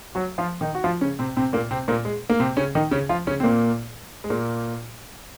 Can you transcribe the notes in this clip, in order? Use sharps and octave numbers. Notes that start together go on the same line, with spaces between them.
F#3 F#4
F3 F4
D#3 D#4
F#4
F3 F4
C#3 C#4
C3 C4
C3 C4
A#2 A#3
C3 C4
A#2 A#3
G#3
A#3
C3 C4
C#3 C#4
D#3 D#4
C#3 C#4
F3 F4
C#3 C#4
C4
A#2 A#3
G#3
A#2 A#3